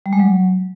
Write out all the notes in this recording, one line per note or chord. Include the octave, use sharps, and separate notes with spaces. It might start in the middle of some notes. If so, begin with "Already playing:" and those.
G3
G#3
F#3